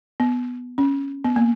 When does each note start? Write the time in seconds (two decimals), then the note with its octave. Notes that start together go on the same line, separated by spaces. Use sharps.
0.20 B3
0.78 C#4
1.24 B3
1.36 A#3